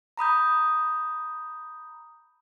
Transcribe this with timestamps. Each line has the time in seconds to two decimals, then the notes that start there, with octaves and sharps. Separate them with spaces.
0.17 A#5 B5 D#6 G6